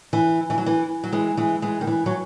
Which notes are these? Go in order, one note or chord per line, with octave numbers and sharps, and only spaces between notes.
E3
E3
F#3
E3
F#3
E3 G#3
E3 G#3
E3 G#3
D#3
E3
F#3